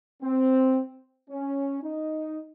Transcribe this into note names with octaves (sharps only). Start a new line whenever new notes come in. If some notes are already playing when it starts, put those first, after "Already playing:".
C4
C#4
D#4